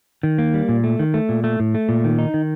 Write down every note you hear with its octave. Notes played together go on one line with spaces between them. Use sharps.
D#3
A#3
G3
A#2
A3
D#3
A3
A#2
A3
A2
A3
A#2
D#3
D#4
D#3